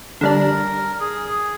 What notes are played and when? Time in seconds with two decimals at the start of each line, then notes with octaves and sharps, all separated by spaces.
0.21 D3 G3 D4 A#4
1.00 G#4